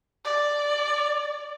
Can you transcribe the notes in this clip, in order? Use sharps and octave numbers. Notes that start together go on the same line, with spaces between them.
D5